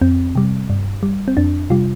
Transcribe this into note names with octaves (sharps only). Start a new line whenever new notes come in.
F2 C4
C3 G3
G2
G3
C4
F2 D4
C3 G3 F4